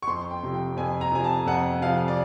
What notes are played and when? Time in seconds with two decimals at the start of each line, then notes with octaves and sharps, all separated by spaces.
0.02 C#6
0.07 F2 C6
0.31 G5
0.43 C3 F3
0.54 G5
0.77 F2 G#5
1.01 A#5
1.12 C3 F3 G#5
1.24 A5
1.46 F2 F#5
1.81 C3 F3 F5
2.08 D5